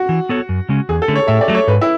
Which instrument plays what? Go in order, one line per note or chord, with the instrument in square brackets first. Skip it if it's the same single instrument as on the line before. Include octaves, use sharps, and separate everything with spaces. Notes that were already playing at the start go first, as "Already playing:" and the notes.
Already playing: [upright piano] F#4
[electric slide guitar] E3
B3 F#4 A4 C#5
F#2
C#3 G#3 C#4
[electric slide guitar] E2 [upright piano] G#4
[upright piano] A4
[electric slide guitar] D3 A3 C#4
[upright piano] C#5
[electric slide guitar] A2 [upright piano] E5
[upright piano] D5
[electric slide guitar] F#3 A3
[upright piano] C#5
[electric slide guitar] G#2 [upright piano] B4
[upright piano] E4